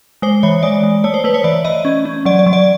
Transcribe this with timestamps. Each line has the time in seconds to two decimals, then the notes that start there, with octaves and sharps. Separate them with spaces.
0.22 G#3 C5
0.43 E3 C#5
0.63 G#3 D5
0.83 G#3
1.04 A3 C#5
1.14 C5
1.24 A3 B4
1.34 C#5
1.44 E3 D5
1.65 E3 D#5
1.85 C#4
2.05 C#4
2.25 F#3 D5
2.39 D5
2.46 F#3
2.53 D5